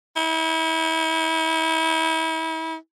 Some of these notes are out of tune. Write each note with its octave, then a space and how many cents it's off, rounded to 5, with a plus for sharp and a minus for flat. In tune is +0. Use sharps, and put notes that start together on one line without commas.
E4 -35